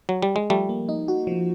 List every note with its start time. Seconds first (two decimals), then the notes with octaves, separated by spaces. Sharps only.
0.09 F#3
0.22 G3
0.36 G#3
0.50 F3 G3 A3
0.69 A#3
0.89 D#4
1.08 F#4
1.27 F3